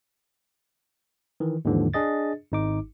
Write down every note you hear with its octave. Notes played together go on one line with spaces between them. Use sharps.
D#3 E3
D#2 G#2 D3 E3 F3
D4 G#4 D#5 A6
G#1 D#4 D6